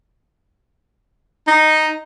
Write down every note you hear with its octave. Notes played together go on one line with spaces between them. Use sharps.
D#4